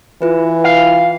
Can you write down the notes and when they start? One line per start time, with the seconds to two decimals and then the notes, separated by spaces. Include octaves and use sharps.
0.22 E3 F4 B4
0.64 F5